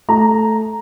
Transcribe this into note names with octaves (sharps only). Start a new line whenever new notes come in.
A3 A#5